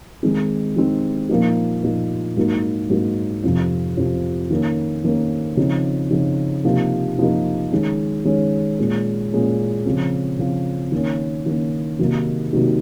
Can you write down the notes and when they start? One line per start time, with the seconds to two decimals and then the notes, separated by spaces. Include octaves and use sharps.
0.23 D#3 G#3 C4 D#4
0.77 D#3 G#3 C4 D#4
1.29 A#2 F3 A#3 D#4
1.83 A#2 F3 A#3 D#4
2.36 G#2 F#3 A#3 D#4
2.90 G#2 F#3 A#3 D#4
3.44 F2 C3 F3
3.97 F2 C3 F3
4.51 D#3 A#3 C#4
5.04 D#3 A#3 C#4
5.57 C#3 F3 C4 D#4
6.11 C#3 F3 C4 D#4
6.65 C3 F3 A#3 D#4
7.18 C3 F3 A#3 D#4
7.72 D#3 G#3 C#4
8.25 D#3 G#3 C#4
8.79 A#2 G#3 C#4
9.32 A#2 G#3 C#4
9.85 C#3 F3 C4
10.39 C#3 F3 C4
10.92 D#3 A#3 C#4
11.46 D#3 A#3 C#4
11.99 C3 D#3 F#3 A#3 D#4
12.53 C3 D#3 F#3 A#3 D#4